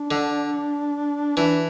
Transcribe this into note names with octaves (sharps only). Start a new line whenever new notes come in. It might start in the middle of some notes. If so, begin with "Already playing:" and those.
Already playing: D4
D3
E3 D4